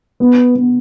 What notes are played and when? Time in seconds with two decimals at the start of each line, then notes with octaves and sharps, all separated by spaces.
0.20 B3
0.55 B3